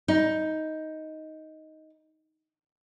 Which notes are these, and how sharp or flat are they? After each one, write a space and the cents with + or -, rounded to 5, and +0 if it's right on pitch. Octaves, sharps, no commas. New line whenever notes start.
D#4 +10